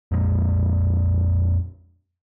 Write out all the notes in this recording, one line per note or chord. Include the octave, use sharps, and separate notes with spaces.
F2 A#2 G#3